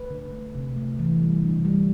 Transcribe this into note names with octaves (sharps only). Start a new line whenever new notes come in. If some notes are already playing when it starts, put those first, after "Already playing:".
Already playing: A3 B4
D3
A3
C3
A3
E3
G3
D3
G3